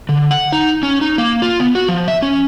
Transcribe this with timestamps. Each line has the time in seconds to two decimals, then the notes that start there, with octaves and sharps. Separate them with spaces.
0.09 D3
0.31 F#5
0.52 D#4
0.83 C#4
1.01 D#4
1.18 A#3
1.42 F4
1.60 B3
1.75 F#4
1.89 F3
2.08 E5
2.22 C#4